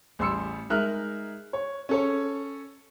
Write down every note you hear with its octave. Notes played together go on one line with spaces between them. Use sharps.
A1 G3 C6 E6 C#7
G#3 D#4 A#4 E5 F6 F#6
C#5
C#4 A4 C#5